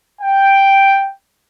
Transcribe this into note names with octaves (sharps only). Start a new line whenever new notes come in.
G5